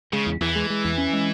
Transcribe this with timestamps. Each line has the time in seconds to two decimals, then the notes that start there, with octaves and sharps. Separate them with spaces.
0.13 C#3 G#3
0.27 E2
0.41 E2 E3
0.56 G#3
0.70 G#3
0.85 E2
0.98 C#4
1.13 G#3